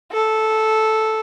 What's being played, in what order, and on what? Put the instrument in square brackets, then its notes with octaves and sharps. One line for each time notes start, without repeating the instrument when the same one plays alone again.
[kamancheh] A4